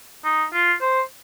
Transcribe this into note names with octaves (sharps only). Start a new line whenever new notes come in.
D#4
F4
C5